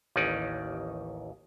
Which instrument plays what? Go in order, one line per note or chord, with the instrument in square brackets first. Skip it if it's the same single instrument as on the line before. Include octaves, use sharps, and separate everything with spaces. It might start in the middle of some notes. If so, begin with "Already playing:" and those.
[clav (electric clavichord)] A1 D#2 C#4 D#4 D5